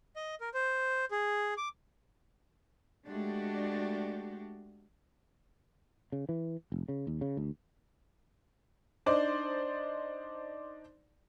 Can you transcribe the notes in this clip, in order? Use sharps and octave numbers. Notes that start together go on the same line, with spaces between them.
D#5
A#4
C5
G#4
D6
G#3 A3 D4 F#4 G4
C#3
E3
F1
C#3
D#2
C#3
D2
D4 D#4 C5 D5